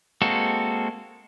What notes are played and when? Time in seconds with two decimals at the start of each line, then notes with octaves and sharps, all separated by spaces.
0.22 G#3 A#3 C4 F#4 A4